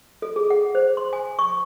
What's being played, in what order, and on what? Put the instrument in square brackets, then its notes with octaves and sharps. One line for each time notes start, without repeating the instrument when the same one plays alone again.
[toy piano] A4
G#4
F#5
C5
C6
G#5
C#6